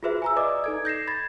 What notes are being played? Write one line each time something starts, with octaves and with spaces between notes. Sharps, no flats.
F4 F#4 G#4 B4 C5 E5
G#5 A#5 E6
B4 D5 D#5 D6 D#6
D#4 A4 G#6
G6 A#6 C7 E7
B5 G#6 A6